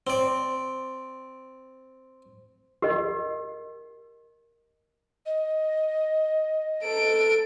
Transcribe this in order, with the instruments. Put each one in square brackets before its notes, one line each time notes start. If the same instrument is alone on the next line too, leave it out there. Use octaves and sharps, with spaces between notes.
[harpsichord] C4 D5
[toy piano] G4 A#4 D#5
[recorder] D#5
[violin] A4 D7